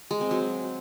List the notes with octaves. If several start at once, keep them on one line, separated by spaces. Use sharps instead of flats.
G#3
C4
F#3